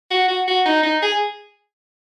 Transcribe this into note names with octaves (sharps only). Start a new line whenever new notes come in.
F#4
F#4
F#4
D#4
D#4
G#4